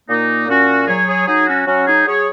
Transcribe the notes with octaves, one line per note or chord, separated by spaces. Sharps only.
A#2 A#3 D#4
A#2 C#4 F#4
F#3 G#4 C#5
G#4 C#5
F#3 D#4 G#4
C#4 F#4
F#3 C#4 F#4
D#4 G#4
F#3 G#4 C#5